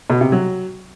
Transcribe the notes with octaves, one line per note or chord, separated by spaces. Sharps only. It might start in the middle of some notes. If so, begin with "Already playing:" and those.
B2
C3
F#3